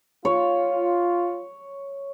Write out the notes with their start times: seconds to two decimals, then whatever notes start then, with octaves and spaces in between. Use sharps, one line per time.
0.25 F4 C#5